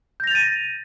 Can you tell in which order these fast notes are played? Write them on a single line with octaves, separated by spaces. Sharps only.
G6 A#6 F7 A6 D#7